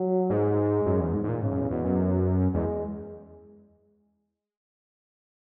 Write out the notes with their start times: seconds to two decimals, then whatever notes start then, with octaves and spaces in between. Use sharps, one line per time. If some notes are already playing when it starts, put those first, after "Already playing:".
Already playing: F#3
0.30 G#2 G#3
0.86 F#2
1.00 E2
1.14 G#2
1.24 G#2
1.29 A#2
1.42 G#2 C#3
1.51 F#2
1.60 E2
1.71 E2 B2
1.84 F#2
2.54 E2 G#3